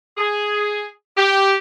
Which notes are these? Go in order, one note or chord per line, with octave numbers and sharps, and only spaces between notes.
G#4
G4